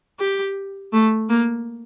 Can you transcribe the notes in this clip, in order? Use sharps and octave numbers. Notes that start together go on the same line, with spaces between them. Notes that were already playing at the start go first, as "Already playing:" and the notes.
G4
A3
A#3